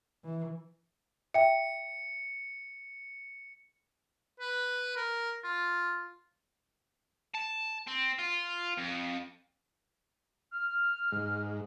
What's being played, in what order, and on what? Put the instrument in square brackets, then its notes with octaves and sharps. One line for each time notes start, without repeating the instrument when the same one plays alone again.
[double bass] E3
[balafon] E5 G5 [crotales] C#7
[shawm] B4
A#4
F4
[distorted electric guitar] A5
C4
F4
F2
[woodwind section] F6
[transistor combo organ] G#2